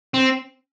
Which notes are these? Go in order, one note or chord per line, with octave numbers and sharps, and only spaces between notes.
C4